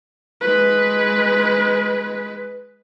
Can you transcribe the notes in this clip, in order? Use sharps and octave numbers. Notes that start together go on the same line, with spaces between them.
G#3 B4